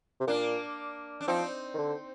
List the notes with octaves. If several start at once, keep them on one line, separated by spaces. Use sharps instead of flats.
C3
A#2 A#3 D4
D4
F3 C4 D#4
D#3
D3